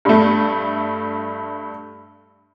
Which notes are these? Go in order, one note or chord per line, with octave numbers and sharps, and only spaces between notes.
G2 A3